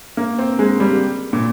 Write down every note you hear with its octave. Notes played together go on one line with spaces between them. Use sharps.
A#3
C4
G#3
G3
A#2